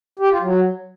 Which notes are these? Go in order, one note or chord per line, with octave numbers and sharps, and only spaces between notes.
G4
F4
F#3